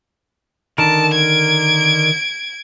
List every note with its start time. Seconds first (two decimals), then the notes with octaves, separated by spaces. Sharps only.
0.78 D3 D#3 A#4 A5
1.14 G#6 D7